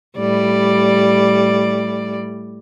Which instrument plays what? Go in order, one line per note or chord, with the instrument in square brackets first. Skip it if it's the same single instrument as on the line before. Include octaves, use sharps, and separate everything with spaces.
[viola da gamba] A2 G3 D5